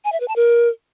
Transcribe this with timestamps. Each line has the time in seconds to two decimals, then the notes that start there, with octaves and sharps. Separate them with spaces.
0.05 G#5
0.12 E5
0.20 B4
0.28 A5
0.36 A#4